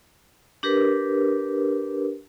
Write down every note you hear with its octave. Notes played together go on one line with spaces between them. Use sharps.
D4 G4 A#4 B4